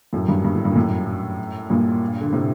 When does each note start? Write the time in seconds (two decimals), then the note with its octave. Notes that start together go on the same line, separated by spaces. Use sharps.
0.13 F#2 A2
0.28 G2
0.44 G2
0.54 A2
0.65 G2
0.72 A#2
0.75 F#2 A2
1.70 G2 A#2
2.21 D3
2.33 A2 C3